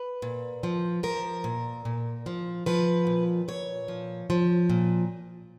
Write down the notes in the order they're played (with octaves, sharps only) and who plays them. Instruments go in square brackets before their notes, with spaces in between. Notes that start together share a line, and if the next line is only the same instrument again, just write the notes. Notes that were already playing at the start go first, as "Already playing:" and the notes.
Already playing: [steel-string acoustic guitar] B4
A#2
F3
F3 A#4
A#2
A#2
F3
F3 B4
A#2
A#2 C#5
F3
F3
A#2